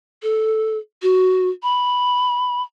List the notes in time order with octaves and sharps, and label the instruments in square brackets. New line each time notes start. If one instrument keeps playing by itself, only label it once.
[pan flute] A4
F#4
B5